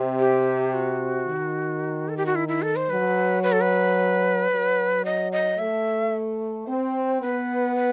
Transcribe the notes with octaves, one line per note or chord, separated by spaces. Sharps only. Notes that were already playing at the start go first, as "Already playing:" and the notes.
Already playing: C3
G4
F#4
D#3
A4
G4
F#4
E4
E4
A4
C5
F#3 B4
B4
A4
B4
F#3
D#5
D#5
A3 E5
C4 C5
B3 B4
B4